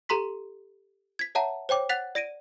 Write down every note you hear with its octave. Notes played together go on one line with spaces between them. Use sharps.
G4 A4 A#5 C6 B6
G#6 B6
C#5 E5 F#5 A5 A#5
C5 C#5 G5 D6
F#5 F#6 A6 B6 F7
D5 A#6 D7 D#7